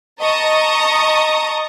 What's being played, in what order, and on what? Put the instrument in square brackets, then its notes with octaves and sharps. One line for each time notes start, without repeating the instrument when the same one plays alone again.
[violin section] D#5 A5 A#5 C#6 D#6